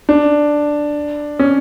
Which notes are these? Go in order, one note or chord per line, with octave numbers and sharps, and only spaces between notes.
D4
C#4